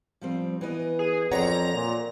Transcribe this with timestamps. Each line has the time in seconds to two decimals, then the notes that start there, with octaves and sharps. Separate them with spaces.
0.21 F3 G3 C4
0.61 E3 B3 D#5
0.99 G#4
1.31 F2 F#4 C#5 D5 F#5 A#5 A#6
1.74 A#2